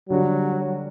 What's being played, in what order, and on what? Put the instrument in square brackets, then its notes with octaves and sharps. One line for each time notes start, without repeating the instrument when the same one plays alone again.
[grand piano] D3 G3 D4 F#4 [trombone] F#3